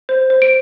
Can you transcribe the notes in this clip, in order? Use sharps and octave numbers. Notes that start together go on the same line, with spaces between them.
C5
C5
D7